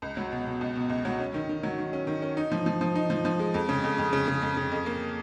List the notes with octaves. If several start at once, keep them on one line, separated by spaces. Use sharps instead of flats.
C#2
F#3
B2
B2
C#2
B2
C#2
F#3
C#4
D#3
D#3
F#3
D#3
C#4
D#3
C#4
D#4
F3
F3
F3
D#4
F3
F3
G#3
F2
C#3
F2
F2
C#3
C#3
F2
C#3
F2
A#3